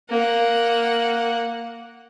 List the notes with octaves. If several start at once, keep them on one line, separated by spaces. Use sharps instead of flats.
A#3 F#5